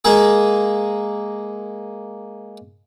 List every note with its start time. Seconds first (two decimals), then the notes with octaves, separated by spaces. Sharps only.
0.05 G#3 A#3 G#4